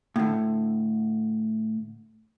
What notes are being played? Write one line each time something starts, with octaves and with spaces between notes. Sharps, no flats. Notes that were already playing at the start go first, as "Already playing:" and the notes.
A2 D3